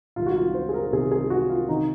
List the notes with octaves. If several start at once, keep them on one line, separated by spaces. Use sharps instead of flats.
C2 C3 D#3 F4
F#4
F4
C5
G#4
A#4
C2 C3 D#3 G#4
G#4
F#4
F4
C3 D#3 D#4